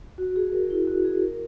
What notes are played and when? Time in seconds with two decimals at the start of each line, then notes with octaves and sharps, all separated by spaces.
0.18 F#4
0.36 G#4
0.53 A#4
0.70 E4
0.87 F#4
1.05 G#4
1.22 A#4